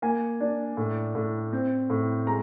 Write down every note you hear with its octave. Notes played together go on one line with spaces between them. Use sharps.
A#3 G#5
D4
A2
A2
C4
A2
G#3 A#5